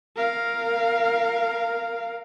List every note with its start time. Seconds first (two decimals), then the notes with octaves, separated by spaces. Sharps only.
0.16 A#4 F5